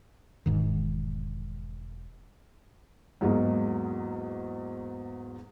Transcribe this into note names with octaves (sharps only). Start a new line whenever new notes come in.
E1 G#2 D#3
E2 G#2 F#3 G#3 A#3